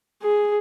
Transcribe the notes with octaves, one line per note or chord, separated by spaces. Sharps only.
G#4